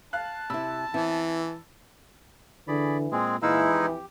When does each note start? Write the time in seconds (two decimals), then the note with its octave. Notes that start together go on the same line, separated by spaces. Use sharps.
0.13 F5 A5 F#6
0.50 C3 E4 B5 E6
0.94 E3 B3 C4 E4
2.68 D3 E3 G#4 D5 B5
3.12 A#2 G#3 C4 G#4
3.42 A#2 E3 G#3 D#4 E4 F5 E6
3.72 F2 G4